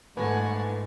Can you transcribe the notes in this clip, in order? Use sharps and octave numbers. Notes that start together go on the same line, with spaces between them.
G1 G#2 A3 A4 B4 F#5 G#5 A#6